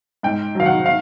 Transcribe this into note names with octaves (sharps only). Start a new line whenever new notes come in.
G#2 G5
D#3 F#3 F5
F#5
F5